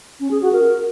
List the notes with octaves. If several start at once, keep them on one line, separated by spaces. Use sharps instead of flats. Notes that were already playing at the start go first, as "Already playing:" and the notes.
C#4
G#4
F#4
A#4